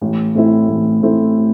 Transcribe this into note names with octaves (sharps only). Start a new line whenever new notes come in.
A1
A2 A3 C4 E4
A1
A2 A3 C4 E4